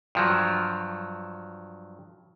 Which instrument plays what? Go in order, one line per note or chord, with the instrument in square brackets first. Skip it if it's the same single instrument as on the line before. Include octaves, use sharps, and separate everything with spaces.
[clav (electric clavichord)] G2 F3 F#3